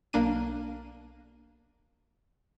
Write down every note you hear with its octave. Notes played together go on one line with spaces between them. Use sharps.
B1 A#3 D4 D#7